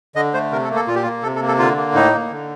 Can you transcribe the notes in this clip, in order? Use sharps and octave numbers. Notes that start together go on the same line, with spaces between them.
D3 D#5
A3 C5
C3 A#4
A4
A#3
A4
A#2 F4
G4
A#3 F4
C3 A4
A4
A#3
A4
D3 F4
A#3
A2 D#4
A#3
D3